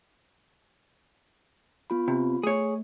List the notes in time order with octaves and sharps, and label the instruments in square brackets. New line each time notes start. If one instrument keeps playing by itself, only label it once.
[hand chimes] B3 F4 B5
[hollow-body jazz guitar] C3
[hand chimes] A3 [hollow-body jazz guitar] G#4 C#5